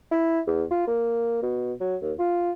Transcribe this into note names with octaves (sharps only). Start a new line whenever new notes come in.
E4
E2
F4
A#3
B2
F#3
D#2
F4